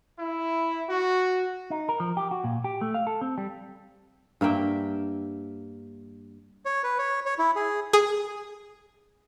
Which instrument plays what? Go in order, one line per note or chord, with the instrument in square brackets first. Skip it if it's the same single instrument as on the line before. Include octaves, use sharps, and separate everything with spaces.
[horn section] E4
F#4
[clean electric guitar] D#4
A#4
F3
G4
F#4
A#2
G4
A3
F5
A4
C4
G3
[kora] G2 A#3 E5 G5
[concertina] C#5
B4
C#5
C#5
E4
G#4
[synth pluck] G#4